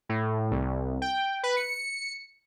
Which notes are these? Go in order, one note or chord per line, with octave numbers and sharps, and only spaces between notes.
A2
C2
G5
B4
C#7